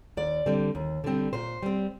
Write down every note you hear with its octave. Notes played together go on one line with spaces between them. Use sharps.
D#2 D5
D3 G3 C4
D#2
D3 G3 C4
A#2 C5
G3 C4